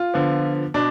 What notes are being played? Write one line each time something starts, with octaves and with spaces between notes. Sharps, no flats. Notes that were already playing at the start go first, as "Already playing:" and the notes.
Already playing: F4
D3 F3 B3
B2 D4